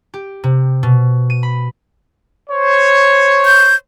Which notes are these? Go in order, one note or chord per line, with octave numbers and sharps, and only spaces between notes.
G4
C3
B2
D#7
B5
C5 C#5
G6